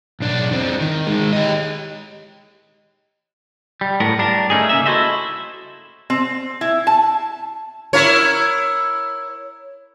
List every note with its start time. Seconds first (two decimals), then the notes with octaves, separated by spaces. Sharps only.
0.20 B1 D4
0.51 E2 C4
0.81 D#3
1.07 D#3 G#3
1.33 G4 D#5
3.81 G3
4.00 A2 B3 A#4
4.19 G2 D4 A#4
4.50 A3 C#4 D#4 G#4
4.69 C#3 A#3 E5
4.86 E4 F#4 A4 C5 D#5 E5
6.10 C4
6.61 E4
6.87 A5
7.93 E4 A#4 C#5